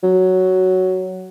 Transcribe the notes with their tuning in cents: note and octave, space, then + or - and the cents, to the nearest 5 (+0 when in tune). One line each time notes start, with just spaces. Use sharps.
F#3 +5